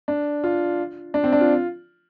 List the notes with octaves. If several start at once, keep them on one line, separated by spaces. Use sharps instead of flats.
D4
F4
D4
C4
D4
F4